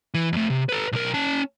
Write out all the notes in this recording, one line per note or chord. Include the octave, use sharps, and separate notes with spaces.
E3
F2 A3
C3
A4 B4
B1 A#4
C#4 A5